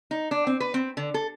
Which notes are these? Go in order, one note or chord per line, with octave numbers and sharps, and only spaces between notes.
D#4
D4
C4
B4
C4
D3
A4